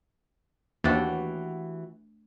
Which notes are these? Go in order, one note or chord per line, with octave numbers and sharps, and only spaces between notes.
D#2 E3 A3 D4 F#4 G4 A4